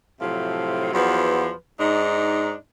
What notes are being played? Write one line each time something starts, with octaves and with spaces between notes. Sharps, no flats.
A2 C3 F3 F#3
E2 F3 F#3 B4
G#2 D4 D#4